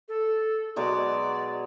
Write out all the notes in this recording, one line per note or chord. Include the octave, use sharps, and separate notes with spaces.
A4
B2 F#3 G#3 D5